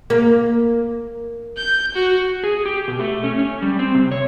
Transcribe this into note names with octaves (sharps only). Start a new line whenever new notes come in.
A#3
G6
F#4
G#4
G4
B2
A3
C#4
C#4
G3
C4
C3
C#5